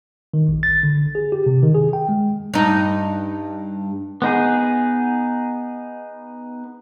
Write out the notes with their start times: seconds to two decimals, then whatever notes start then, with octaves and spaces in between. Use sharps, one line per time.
0.34 D#3
0.48 A#1
0.63 A6
0.83 D3
1.15 G#4
1.32 G4
1.46 C3
1.63 D#3
1.74 G#4
1.93 G5
2.09 G#3
2.54 G2 D#4
4.22 B3 D#4 G#4